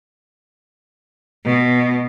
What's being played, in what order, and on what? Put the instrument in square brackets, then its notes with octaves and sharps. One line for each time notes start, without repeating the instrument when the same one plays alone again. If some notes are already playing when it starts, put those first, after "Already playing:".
[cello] B2